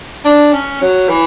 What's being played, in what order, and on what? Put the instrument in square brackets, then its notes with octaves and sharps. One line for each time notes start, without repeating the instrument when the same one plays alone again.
[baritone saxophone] D4
C#4
F#3
E3